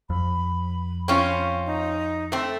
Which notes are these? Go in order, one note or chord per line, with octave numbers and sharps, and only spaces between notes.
F2 B5
C4 C#4 F4
D#4
A3 C4